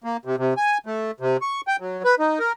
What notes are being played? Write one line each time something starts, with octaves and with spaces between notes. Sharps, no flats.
A#3
C3
C3
G#5
A3
C3
C#6
G5
F#3
B4
D#4
A#4